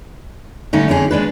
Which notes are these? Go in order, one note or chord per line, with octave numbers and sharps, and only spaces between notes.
A2 D3 G3 A3 C#4 D#4
F2 D3 C#4 E4 G#4
F2 G#3 D4 B4